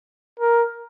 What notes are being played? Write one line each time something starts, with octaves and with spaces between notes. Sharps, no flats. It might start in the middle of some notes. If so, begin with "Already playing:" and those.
A#4